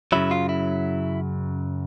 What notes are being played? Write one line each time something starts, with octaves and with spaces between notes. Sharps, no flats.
F#2 C#3 F#3 E4
F4
E4